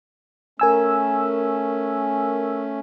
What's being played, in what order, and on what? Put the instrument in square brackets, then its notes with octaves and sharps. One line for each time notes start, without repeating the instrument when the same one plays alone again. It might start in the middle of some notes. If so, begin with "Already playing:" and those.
[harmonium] A3 C#4 [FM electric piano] A#4 G#5 E6